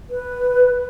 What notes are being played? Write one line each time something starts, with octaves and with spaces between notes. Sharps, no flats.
B4